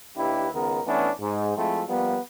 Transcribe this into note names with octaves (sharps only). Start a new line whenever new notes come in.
D#2 D4 E4 G4 B4
C#2 D#3 G#3 B3 A#4
E3 A3 B3 C#4 D4
G#2
F3 G#3 A3 C4 E4
F3 G3 A#3 B3